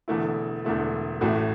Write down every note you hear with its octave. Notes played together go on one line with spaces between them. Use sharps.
E1 E2 D3 A3 E4
E1 E2 D3 A3 E4
A1 A2 A3 F#4